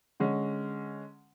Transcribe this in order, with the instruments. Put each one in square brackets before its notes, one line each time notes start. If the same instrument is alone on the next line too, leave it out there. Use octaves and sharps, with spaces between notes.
[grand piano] D3 G#3 C#4